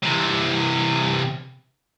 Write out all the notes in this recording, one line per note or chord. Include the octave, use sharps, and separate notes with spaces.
C3 E3